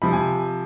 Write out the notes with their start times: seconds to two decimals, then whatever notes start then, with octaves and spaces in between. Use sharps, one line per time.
0.02 C3 F3 B5
0.13 G#5